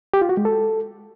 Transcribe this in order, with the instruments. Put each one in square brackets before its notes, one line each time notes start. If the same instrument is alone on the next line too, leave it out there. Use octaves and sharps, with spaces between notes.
[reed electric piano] G4
F4
F#4
G#3
A4